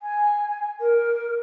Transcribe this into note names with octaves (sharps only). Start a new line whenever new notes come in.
G#5
A#4